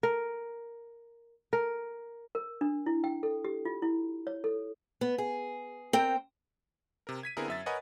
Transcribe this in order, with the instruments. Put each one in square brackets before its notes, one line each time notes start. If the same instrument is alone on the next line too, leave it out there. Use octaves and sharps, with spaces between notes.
[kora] A#4
A#4
[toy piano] A#4
D4
E4
G5
A4
G4
F4
E4
C#5
A4
[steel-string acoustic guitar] B3
G#4
C4 A#4 G5
[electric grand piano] C3 A#4
G#6 B6 D#7
D3 B3 C4 E4 G#4 A#4
F#2 E5 A6
A#4 B4 C#5 D#5 F#5 G#5